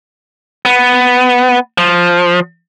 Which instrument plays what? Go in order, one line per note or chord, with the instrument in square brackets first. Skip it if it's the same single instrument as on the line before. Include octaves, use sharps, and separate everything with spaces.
[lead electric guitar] B3
F3